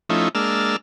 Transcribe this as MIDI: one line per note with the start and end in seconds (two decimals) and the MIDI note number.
0.09 0.29 53
0.09 0.29 57
0.09 0.29 61
0.09 0.29 63
0.09 0.29 64
0.35 0.76 56
0.35 0.76 58
0.35 0.76 62
0.35 0.76 81
0.35 0.76 88
0.35 0.76 89